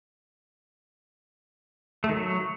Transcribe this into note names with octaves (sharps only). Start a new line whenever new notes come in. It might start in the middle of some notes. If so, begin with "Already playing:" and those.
A3
D#3
F#3